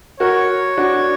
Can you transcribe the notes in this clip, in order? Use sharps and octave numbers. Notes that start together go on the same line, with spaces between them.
F#4 A#4 C#5
D4 F#4